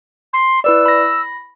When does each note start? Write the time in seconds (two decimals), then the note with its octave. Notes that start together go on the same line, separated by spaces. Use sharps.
0.33 C6
0.64 E4 B4 D5 E6
0.86 B5 A#6